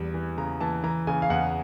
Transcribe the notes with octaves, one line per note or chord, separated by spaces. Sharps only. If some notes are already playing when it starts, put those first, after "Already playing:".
Already playing: E2 G3
E3
C#3 A#5
E3 A5
E3 A#5
C#3 G#5
F5
E2 F#5